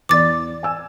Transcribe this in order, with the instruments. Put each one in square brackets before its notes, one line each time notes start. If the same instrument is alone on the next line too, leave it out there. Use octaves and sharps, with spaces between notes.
[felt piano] E2 D5 [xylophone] D6 A6
[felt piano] G#5 E6